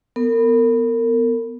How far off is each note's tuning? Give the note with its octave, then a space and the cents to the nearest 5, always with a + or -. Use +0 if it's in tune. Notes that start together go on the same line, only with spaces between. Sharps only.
B3 +0 A#4 -35